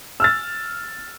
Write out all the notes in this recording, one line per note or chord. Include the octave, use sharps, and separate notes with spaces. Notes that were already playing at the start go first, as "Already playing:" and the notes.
E6 F6 A6